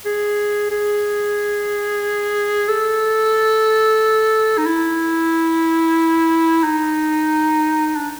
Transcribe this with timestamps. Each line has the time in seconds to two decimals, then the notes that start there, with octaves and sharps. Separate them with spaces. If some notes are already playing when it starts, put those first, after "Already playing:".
0.05 G#4
0.70 G#4
2.68 A4
4.58 D#4
4.66 E4
6.64 D#4
7.96 D4